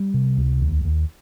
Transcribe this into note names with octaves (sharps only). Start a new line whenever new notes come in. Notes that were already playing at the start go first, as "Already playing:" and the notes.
Already playing: G3
C3
C#2
D#2
D#2